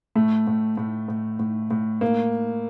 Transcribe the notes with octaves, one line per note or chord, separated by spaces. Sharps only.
A2 A3
A2
A2
A2
A2
A2
A2 A#3